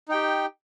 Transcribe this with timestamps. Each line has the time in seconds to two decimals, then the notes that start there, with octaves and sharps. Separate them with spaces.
0.09 D#4
0.11 G5
0.14 G4